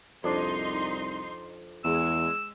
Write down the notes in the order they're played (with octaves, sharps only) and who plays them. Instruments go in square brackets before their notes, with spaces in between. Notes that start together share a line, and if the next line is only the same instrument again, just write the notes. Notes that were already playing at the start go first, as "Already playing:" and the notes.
[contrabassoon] C2 [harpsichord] F2 D4 [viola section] D#4 C6
[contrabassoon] E2 [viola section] G#3 [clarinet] E6